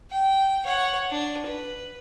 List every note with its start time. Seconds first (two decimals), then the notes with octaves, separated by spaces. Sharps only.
0.11 G5
0.66 C#5 F#5
1.10 D4
1.47 B4